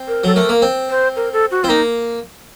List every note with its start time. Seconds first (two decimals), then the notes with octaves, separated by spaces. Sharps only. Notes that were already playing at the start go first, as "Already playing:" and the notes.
Already playing: C4
0.08 A#4
0.24 F#3 A4
0.35 A3 A#4
0.49 A#3
0.62 C4
0.90 C5
1.16 A#4
1.33 A4
1.51 F#4
1.63 C4 F4
1.69 A#3 D#4